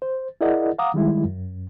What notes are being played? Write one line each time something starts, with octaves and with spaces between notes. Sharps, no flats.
C5
E4 G#4 A#4 D5 D#5 F#5
F5 F#5 A#5 D6 D#6
D#3 G3 G#3 E4
F#2